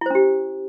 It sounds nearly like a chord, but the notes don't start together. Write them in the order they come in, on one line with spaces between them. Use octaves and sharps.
E4 C5 C#4 G4